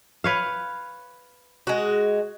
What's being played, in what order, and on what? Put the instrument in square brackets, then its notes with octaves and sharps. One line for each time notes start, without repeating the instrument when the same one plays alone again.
[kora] B4 C#5 F5
[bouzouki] G#3 F#4